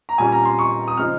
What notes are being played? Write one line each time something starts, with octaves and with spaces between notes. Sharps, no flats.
A#5
A#2 G3 C#4 G#5
A#5
C6
C#6
D#6
C#3 F3 G#3 D#4 F6